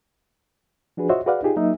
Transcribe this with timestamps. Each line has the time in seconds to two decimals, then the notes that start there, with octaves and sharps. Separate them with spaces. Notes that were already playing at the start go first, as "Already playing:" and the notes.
0.97 F3 D4 F#4 G#4 B4
1.09 F4 F#4 C5 C#5 D#5 E5
1.26 F#4 G#4 B4 D5 F5 F#5
1.43 D#4 F4 G4 G#4
1.56 F#3 A#3 D#4 E5